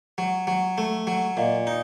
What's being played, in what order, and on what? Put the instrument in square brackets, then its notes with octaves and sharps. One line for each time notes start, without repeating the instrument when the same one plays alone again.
[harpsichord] F#3
F#3
A3
F#3
[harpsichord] A#2 [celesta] D#5 F5
[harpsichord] D#4